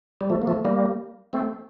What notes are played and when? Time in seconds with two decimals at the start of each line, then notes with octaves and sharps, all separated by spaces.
0.21 G3
0.30 F3 A3
0.42 A#3
0.47 F3 A3
0.65 G3 A#3
1.33 A3 C4